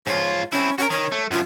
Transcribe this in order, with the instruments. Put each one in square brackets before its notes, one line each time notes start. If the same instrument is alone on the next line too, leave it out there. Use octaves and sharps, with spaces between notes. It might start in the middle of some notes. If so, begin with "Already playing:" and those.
[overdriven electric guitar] G#2 F4 [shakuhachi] C#5
[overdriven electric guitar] C4 E4 [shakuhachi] C#4
[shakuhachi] C#4 [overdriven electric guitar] F#4 A#4
[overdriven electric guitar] D#3 [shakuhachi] C#5
[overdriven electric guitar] A3
[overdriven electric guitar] F#2 F3 [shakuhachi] F4